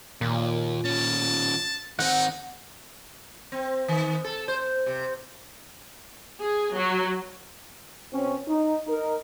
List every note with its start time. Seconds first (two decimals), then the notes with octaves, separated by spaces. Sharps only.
0.21 D#2 A#2
0.85 D#3 C#4 A5
1.99 D#3 C4 D#4 F#5
3.52 C4
3.88 D#3
4.24 A4
4.48 C5
4.86 C3
6.41 G#4
6.74 F#3
8.13 B2 C4 C#4
8.48 D#4
8.87 D#4 A#4